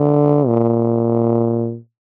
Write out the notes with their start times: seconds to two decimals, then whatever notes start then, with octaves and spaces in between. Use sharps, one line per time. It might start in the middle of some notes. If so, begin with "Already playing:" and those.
Already playing: D3
0.47 A#2